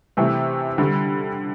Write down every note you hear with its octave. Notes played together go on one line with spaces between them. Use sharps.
C3 E3 A3
D3 G3